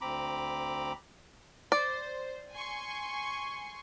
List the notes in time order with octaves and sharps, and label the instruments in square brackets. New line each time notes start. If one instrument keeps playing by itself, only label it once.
[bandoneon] D2 C4 A#5 B5 D6
[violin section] C5 [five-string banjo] D5
[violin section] G#5 C6 C#6